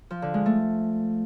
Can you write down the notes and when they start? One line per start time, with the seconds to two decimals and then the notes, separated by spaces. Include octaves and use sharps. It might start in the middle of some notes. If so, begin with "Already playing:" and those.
0.11 F3
0.22 D3
0.34 G#3
0.46 A3